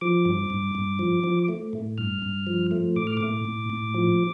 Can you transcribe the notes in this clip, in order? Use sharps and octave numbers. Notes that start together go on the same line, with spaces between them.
F3 D6
G2
G2
G2
F3
F3
A3
A2
G2 F6
G2
F3
A3
A2 D6
F6
A2 D6
A2
A2
F3